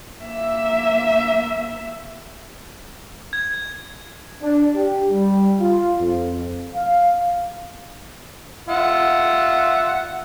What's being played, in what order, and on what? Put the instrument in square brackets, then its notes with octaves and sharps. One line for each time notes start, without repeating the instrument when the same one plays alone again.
[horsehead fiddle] A#3 E5
[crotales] G#6
[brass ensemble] D4
G4
G3
F4
F2
F5
[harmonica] F4 E5 F#5